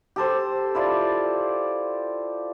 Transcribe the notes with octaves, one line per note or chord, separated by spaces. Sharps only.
G4 A4 C5
E4 F4 D5